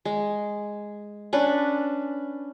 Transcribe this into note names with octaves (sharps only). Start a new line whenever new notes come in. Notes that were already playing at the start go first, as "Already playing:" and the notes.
G#3
C#4 D4 B4